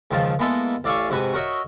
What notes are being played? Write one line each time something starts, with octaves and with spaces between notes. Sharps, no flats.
C#2 D#3 F3 A5
G#3 A#3 B3 E4 A4
A1 D5 E5 F5 G#5 C#6
G#2 C3 F#4 B4 G#5
F#4 A#4 C#5 D#5 E5